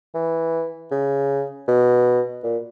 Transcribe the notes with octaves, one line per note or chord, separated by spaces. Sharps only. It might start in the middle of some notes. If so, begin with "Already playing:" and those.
E3
C#3
B2
A#2